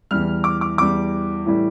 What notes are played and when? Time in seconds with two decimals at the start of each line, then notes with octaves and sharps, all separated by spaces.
0.11 E2 E3 G3 F6
0.44 D6
0.61 D6
0.78 E2 E3 G3 D6
1.45 A2 E3 G3